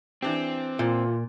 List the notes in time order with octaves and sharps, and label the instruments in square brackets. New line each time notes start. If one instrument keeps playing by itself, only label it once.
[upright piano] E3 D4 G4 [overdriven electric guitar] C4
[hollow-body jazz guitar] A#2 [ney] F4